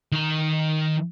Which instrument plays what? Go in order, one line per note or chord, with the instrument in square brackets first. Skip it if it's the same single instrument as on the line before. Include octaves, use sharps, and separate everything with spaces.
[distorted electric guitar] D#3 A#5